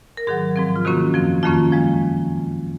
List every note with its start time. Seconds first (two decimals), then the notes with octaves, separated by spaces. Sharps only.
0.17 A#4
0.27 G#2 D#3 F#3 G#4
0.56 G#2 F3 C4
0.76 F4
0.85 C3 D#3 A#3 C#4 F#4
1.14 F#2 F3 C4
1.43 F2 D#3 A#3 C#4 F4
1.72 F3 G#3